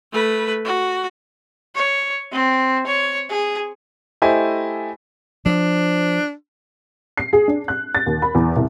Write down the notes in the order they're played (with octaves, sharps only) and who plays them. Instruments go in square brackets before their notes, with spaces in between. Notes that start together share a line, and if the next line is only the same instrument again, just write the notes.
[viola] A3 B4
F#4
[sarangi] C#5
C4
C#5
G#4
[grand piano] A3 E4 G4 C5 D#5 G#5
[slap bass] F3 [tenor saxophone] D4
[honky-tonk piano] C7
G#4
D4
F#6
A6
D#2
B5
E2
C2